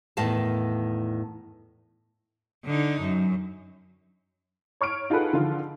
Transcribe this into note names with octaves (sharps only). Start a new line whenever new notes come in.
E2 A2 D#3 F5 A5
D3 D#4
F#2
C#5 C#6 F6 D7
D#4 F4 G#4 A4 B4 F#5
D3 D#3 F3 F4